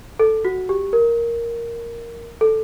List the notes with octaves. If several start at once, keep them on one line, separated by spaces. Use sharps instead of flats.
A4
F#4
G4
A#4
A4